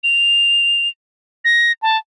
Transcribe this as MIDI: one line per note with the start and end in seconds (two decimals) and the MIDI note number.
0.04 0.88 101
1.45 1.72 94
1.82 1.97 81